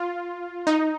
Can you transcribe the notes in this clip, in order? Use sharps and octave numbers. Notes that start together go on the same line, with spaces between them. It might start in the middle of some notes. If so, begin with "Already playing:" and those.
Already playing: F4
D#4